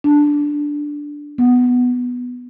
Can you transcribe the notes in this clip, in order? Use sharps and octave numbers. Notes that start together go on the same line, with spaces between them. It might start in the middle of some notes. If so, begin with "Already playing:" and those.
D4
B3